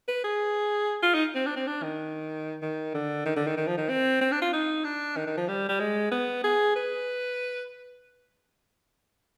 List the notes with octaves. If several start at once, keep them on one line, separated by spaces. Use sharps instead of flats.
B4
G#4
F4
D#4
C4
D4
C4
D4
D#3
D#3
D3
D#3
D3
D#3
D#3
F3
D#3
C4
C4
D4
F4
D#4
D4
D#3
D#3
F3
G3
G3
G#3
B3
G#4
B4